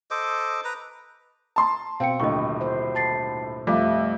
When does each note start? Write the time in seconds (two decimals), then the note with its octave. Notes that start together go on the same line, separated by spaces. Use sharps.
0.11 A4 C5 D#5 D6
0.64 B4 A#5
1.56 A5 C6
2.00 B2 C4 F5 G5 C#7
2.20 D#1 A2 D3 D#5 C#6
2.61 C5
2.95 A5 A6 C7
3.67 F2 G3 A3 E5 F5 D6